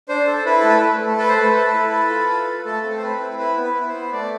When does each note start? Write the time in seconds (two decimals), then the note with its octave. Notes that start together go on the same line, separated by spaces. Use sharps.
0.09 D4 C5
0.27 A4
0.45 E4 B4
0.60 A3 A4
0.69 B4
0.83 A3
1.01 A3
1.18 A4 B4
1.28 C5
1.38 A3 B4
1.56 A4
1.74 E4
1.92 A4
2.10 F4
2.29 A4
2.47 A4
2.65 A3 A4
2.84 C4
2.97 C5
3.02 C4 B4
3.20 E4
3.39 E4 B4
3.57 B3
3.63 B4
3.75 E4
3.88 C5
3.94 B3
4.12 A3 D5